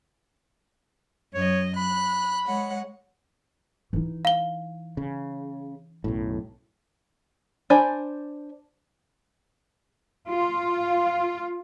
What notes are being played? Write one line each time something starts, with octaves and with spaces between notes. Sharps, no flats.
F#2 C#5 D#5
B5 F#6
G#3 C#5 F#5
E3 D#4
F5 G7
C#3
B1 F#2 A2
D4 C5 D5 G#5 B5
F4